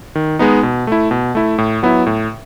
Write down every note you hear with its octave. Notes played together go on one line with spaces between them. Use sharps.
D#3
G#3 B3 D#4
B2
A3 E4
B2
A3 E4
A2
F#3 B3 E4
A2